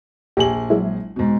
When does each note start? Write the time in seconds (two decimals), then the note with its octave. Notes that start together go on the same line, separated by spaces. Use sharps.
0.37 A#1 G4 G#4 F#7
0.70 F#3 G#3 E4
1.16 G#2 B2